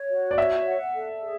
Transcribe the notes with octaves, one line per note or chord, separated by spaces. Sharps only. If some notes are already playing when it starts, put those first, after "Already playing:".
Already playing: C#5
F#4
D5
C#5 E5
F#5
A4
G#4